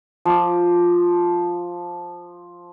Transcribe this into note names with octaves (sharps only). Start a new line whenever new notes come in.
F3 D6